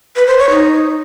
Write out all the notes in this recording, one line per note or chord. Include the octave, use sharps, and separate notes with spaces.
B4
C5
C#5
D#4